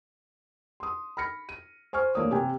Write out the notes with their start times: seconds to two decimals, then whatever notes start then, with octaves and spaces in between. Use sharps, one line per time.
0.80 C6 D#6
1.17 B5 F6 A#6 C#7
1.49 D#7
1.93 C5 G#5 C#6 F6
2.15 E3 A3 A#3 D4 C#5 D#6
2.31 C3 G4 G#5